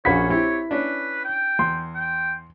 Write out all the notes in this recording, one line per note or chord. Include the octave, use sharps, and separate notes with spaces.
A#1 A#3 C#4 F#4 C#5 B5 B6
C4 E4 G4 C#5
C#4 D4 B4
G5
E2 C6
G5